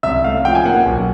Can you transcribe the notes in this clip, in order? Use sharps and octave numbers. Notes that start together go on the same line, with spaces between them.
C2 E5
A3 F5
F3 G5
G#5
A#3 F#5
F#5
B1